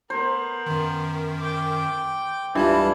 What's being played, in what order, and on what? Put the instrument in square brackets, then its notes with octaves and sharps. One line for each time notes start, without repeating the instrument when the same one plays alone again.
[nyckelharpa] B3 A#4 [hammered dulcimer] C5
[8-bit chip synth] F#2 D#3
[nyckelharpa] G5 D6
[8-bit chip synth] C#2 A5 B5 [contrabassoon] G2 [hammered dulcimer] E3 [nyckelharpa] F4